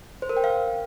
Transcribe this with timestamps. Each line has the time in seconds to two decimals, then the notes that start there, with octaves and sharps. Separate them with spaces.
0.22 C5
0.29 A#4
0.37 G5
0.44 F5